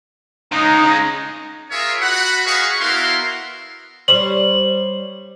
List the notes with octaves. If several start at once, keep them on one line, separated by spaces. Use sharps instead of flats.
C#3 G#3 D#4
F4 G#4 A#4 C#5 E5 F5
F#4 F#5 B5
F#4 G#4 B4 D#5 F5 C#6
B3 E4 F#4 A#4 F5 C6
G3 C5 C#5 F#7